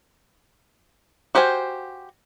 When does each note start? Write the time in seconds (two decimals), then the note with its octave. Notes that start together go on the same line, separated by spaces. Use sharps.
1.35 F#4 G4 C5 F5 G#5